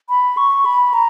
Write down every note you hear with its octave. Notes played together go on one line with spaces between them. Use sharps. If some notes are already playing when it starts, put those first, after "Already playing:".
B5
C#6
B5
A#5